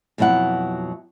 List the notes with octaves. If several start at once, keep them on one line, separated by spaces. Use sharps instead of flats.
F2 B2 F#3 E4 F#5